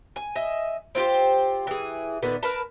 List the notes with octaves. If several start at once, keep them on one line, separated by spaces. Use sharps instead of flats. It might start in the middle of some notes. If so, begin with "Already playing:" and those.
G#5
D#5 E5 G#5
C4 F4 G4 C5
E3 G#4
A#2 D3 D#3 B3
A#4 B4 A5